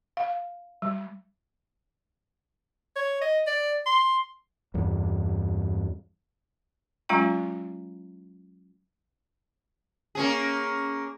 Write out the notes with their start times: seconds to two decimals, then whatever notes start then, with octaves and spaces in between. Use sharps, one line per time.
0.17 F5
0.82 G3
2.96 C#5
3.21 D#5
3.47 D5
3.86 C6
4.74 E2 G2
7.09 F#3 G#3 C#4 F4 G5 A#5
10.15 A#3 C#4 G#4